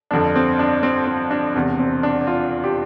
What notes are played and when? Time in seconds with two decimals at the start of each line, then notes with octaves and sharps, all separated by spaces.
0.11 G1 F2 D3 D4
0.36 C4
0.59 D4
0.83 C4
1.07 C4
1.31 D4
1.54 E1 E2 C3
1.79 C4
2.03 D4
2.27 F4
2.64 G4